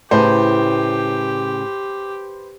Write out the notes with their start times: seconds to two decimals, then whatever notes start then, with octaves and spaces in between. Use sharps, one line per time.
0.11 A2 C#3 G4 B4 C5